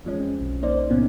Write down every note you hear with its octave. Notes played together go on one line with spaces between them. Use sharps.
E2 F3 G#3 C#4
C4
B1
A#3 D#4 C5 D5
E2 A2 C3 A#3 B3 C#4